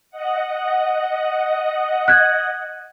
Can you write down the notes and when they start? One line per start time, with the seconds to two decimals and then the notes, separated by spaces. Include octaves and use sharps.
0.11 D#5 F#5
2.08 F#6 G#6